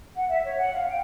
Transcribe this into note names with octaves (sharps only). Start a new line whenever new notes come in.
F#5
E5
C#5
F#5
F5
G5